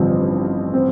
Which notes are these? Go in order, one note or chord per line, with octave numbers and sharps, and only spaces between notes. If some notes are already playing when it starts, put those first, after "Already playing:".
Already playing: A1 G2 D3 F3 C4
C4